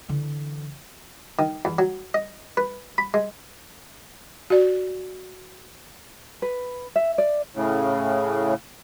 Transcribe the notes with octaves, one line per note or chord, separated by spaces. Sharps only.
D3 E3
D#3
E2
F#3
D#5
B4
B5
G#3
F#4 D5
B4
E5
D5
A2 C#3